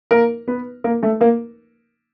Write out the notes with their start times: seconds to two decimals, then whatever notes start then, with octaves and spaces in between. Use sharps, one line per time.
0.11 A#3 A#4
0.48 B3 B4
0.84 A#3 A#4
1.03 A3 A4
1.21 A#3 A#4